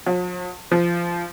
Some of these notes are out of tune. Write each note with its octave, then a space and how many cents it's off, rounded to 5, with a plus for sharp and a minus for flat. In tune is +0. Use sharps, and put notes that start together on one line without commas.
F3 +45
F3 -20